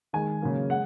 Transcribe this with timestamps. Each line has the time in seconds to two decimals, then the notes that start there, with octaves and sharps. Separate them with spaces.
0.13 D#3 G#3 G#5
0.42 C#3 F#3 A#3
0.70 G#3 F#5